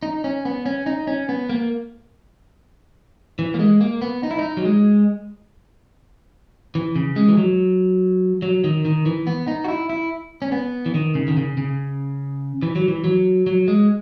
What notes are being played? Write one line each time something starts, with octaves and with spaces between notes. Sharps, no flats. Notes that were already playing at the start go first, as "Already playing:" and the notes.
D#4
C#4
B3
C#4
D#4
C#4
B3
A#3
E3
A#3
G#3
A#3
B3
D#4
E4
D#4
F#3
G#3
E3
C#3
G#3
E3
F#3
F#3
D#3
D#3
E3
B3
D#4
F#4
E4
E4
C#4
B3
E3
D#3
C#3
D#3
C#3
C#3
E3
F#3
E3
F#3
F#3
G#3